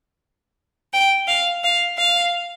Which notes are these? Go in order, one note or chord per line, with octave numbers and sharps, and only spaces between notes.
G5
F5
F5
F5